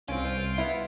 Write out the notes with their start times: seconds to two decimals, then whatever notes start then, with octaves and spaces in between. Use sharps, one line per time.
0.08 C2 C4 C#4 F4 D7
0.25 C5
0.58 B3 E4